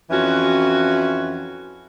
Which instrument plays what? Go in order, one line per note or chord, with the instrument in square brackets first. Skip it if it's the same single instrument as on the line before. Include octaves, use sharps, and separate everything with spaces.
[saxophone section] F2 E3 C#4 F#4